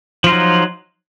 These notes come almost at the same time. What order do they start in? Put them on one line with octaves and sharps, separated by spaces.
F3 F4 D#4 F#3